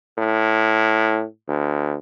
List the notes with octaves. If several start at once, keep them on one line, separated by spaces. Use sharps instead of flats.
A2
D2